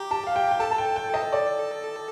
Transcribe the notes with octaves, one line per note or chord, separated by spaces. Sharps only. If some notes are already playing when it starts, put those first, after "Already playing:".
Already playing: G4 A#5
A5
F5
G5
G5
A4 A5
A5
G5
G5
D#5
D5